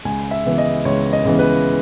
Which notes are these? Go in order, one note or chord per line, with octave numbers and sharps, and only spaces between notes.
C#2 G#5
E5
C#3 E3 B3
D#5
C#2 C#5
D#5
C#3 E3 B3
B4